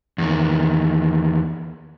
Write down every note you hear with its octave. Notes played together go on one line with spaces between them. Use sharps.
E2 D#3